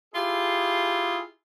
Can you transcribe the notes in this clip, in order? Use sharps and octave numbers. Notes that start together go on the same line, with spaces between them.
E4 F4 G4 G#4